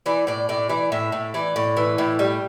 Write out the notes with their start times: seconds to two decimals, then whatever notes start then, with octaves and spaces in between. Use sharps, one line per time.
0.06 E3 D5
0.27 A2 D5
0.49 A2 D5
0.69 E3 D5
0.92 A2 E5
1.12 A2
1.34 E3 D5
1.56 A2
1.77 E3
1.98 A2
2.19 G3